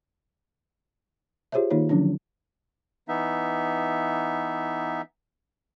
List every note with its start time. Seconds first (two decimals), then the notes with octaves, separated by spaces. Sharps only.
1.52 F4 G4 G#4 C5 C#5 E5
1.70 D#3 A#3 D#4 F4 C#5
1.89 D3 F3 F#3 C#4 D4
3.08 E3 B3 D#4 E5